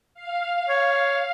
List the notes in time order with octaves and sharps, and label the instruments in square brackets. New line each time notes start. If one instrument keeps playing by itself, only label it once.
[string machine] F5
[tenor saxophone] C#5